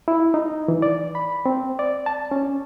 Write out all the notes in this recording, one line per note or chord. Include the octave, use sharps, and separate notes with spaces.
E4
D#4
E3
D5
B5
C4
D5
A5
C#4